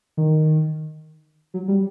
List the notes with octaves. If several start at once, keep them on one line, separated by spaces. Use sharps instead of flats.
D#3
F#3
G3